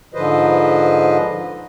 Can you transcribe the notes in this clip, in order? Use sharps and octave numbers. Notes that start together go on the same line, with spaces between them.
G#2 D3 F3 B4 C5 D#5